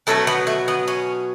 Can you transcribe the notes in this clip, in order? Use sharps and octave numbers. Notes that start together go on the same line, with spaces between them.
B2 F#3 A3 A4
B3
A3
B3
C#4